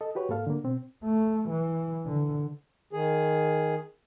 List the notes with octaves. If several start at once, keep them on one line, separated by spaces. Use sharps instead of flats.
A4 D#5
F#4 G4 B4 C#5
G#2 A#3 A4 F5
D3 A#3
B2 C4
A3
E3
D3
D#3 G#4